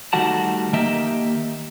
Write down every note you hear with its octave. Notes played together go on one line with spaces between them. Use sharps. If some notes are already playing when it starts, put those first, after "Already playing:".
D#3 G3 A3 F#4 F#5 A5
D#3 A#3 G4 D#5 E5